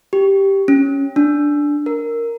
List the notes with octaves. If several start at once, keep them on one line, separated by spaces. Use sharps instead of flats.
G4
C#4
D4
A#4